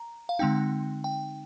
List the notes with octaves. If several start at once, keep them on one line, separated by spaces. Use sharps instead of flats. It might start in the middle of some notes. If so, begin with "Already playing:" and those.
Already playing: A#5
F5
D3 G#3 C4 D#4 G5
G5